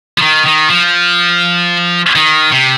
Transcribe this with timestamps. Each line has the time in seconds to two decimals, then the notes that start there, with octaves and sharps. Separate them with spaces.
0.18 F3
0.22 D#3
0.46 D#3
0.70 F3
2.15 D#3
2.52 C3